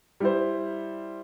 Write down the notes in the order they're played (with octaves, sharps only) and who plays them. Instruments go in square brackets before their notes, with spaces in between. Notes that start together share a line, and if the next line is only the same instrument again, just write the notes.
[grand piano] G3 E4 C5